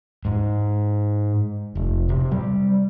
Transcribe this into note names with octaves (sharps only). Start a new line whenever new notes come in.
G#2
F1
C3
G3